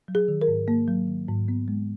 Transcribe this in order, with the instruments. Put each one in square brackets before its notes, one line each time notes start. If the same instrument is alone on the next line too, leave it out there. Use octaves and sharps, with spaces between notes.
[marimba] F#3
G#4
D#3
A#4
G#2
A#3
F#3
D#3
G#2
B3
G#3